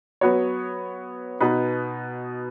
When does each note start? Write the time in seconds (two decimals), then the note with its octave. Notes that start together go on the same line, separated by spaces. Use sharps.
0.21 F#3 B3 F#4 C#5
1.40 B2 B3 D#4 B4